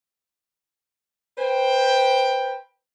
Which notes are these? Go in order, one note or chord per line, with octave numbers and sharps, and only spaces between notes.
B4 C5 G5